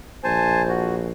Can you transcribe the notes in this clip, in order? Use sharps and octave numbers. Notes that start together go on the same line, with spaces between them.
A#1 C5 G#5 A5
F#4